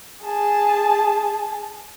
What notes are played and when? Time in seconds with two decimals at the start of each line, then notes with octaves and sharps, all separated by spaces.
0.22 G#4 A5